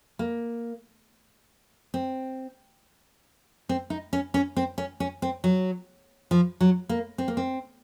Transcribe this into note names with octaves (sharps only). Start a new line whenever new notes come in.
A#3
C4
C4
D#4
C#4
C#4
C4
C#4
C#4
C4
F#3
F3
F#3
A#3
C4
A#3
C4